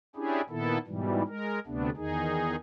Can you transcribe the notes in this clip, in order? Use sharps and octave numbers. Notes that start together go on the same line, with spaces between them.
C#4 D4 E4 G4 G#4
A#2 D#3 B3 E4 A4
G#2 B2 E3 G3
G#3 A#4
D2 C3 A3 B3 D4
E2 D#3 D#4 G#4